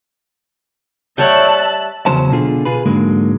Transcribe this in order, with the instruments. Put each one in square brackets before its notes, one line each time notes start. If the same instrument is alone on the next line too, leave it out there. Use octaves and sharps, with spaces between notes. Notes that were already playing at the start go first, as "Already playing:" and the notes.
[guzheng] G3 [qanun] C#5 F#5 G5 [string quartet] E5 A5 F#6
[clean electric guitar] E2 C#3 F#3 C#4 C5 A5
B2 D3 F4 G#4
F4 G#4 B4
G#2 D3 F#3 G#3 A#3